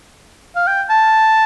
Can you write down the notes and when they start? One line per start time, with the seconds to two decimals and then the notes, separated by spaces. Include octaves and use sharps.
0.56 F5
0.67 G5
0.90 A5